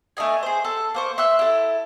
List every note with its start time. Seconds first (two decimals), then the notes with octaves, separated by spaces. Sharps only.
0.17 A3 D4 D#5 G#5
0.43 G#4 C5
0.65 A4
0.95 A#3 C5 C#6
1.18 E5 C6 E6 F#6
1.39 E4 A4